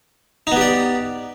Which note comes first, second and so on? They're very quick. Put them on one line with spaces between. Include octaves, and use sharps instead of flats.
D#4 B3 G4 D5